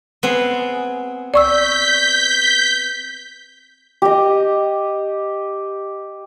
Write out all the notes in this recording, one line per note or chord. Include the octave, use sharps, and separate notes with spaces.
B3 C4 G#4
D5 C#6 E6 G6 B6
G4 D#5